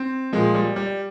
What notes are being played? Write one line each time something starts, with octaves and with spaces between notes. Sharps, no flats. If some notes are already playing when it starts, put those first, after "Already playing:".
Already playing: C4
A#2 F3 G#3
G3
G3